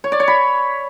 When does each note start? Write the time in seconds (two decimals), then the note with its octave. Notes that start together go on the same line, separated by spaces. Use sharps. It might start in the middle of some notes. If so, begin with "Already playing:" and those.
0.04 C#5
0.12 D5
0.20 C#5
0.28 B5